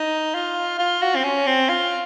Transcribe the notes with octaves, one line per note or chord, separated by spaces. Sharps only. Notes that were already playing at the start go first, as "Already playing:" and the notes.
Already playing: D#4
F4
F4
F#4
C4
C#4
C4
F4